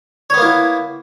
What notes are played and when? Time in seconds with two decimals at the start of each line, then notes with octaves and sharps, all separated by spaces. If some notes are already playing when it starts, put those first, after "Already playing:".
0.30 C#5
0.34 B3
0.38 A#3
0.42 E4